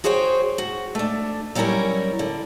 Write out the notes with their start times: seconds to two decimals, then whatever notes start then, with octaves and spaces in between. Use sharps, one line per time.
0.04 F#4 G#4 C5 C#5 F#5 G5
0.58 F#4
0.95 A3 D4
1.55 F#3 G3 C#4 E4 A#4 C#5
2.19 D3